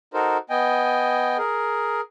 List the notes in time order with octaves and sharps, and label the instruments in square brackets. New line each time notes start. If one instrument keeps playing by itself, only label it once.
[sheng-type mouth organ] D#4 F#4 A4 A#4 C5
B3 D#5 G5 G#5
G#4 A#4